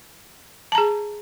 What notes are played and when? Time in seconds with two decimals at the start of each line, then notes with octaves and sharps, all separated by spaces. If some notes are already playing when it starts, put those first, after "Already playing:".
0.72 A5
0.75 A#5
0.78 G#4